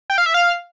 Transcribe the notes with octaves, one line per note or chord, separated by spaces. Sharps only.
G5
F5
E5
F5